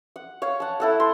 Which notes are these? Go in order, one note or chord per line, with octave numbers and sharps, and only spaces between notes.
F#5
C#5 F5
F#5 A5
E4 A4 F#5
C6